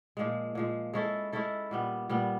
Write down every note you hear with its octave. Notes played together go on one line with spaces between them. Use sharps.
A#2 F3 G#3
A#2 F3 G#3
G#3 C#4 E4 A4
G#3 C#4 E4 A4
A#2 G3 B3
A#2 G3 B3